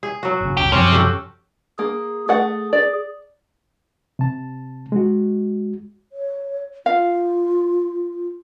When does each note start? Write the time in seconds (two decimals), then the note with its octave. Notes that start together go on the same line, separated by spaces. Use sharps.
0.03 G#4
0.23 F#3 F#4
0.41 G1 C#3
0.57 G1 C#2 C3 G4
0.72 F#2 C3 F3 C#4
0.92 F#4 G4 A4
1.79 A#3 G#4
2.29 A3 G#4 F#5
2.73 D5
4.19 C3 A5
4.92 G#3 F#4
6.12 C#5
6.86 F4 F5